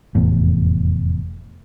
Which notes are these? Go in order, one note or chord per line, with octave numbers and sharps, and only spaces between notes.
F1 E2 A2